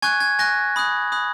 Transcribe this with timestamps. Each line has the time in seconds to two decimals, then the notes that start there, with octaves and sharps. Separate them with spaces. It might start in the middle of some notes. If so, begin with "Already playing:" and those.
0.02 G#5 C#6 F#6 G#6
0.20 G#6
0.39 G#5 C#6 F#6 A#6
0.76 B5 D#6 F#6
1.12 B5 D#6 F#6